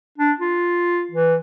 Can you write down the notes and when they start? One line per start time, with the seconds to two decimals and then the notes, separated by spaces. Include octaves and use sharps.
0.18 D4
0.40 F4
1.11 E3